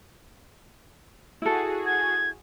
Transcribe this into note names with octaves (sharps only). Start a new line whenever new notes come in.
E4 F#4 G#4 A4
G#6